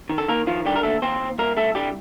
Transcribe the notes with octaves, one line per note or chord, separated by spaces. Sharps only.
D#3
A4
D#3 A#3 A#4
D#3 F3 F4
D3 G3 G4
A#4
D#2 A3 A4
D#2 C4 C5
D#2
C2 A#3 A#4
C2 A3 A4
D3 G3 G4